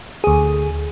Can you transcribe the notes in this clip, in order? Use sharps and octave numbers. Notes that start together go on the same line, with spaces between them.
D2 G#4